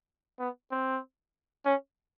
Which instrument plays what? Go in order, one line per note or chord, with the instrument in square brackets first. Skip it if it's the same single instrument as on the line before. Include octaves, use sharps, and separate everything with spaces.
[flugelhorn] B3
C4
C#4